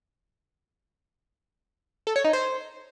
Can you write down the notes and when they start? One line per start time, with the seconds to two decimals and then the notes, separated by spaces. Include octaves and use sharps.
2.07 A4
2.16 C#5
2.25 D#4
2.33 C5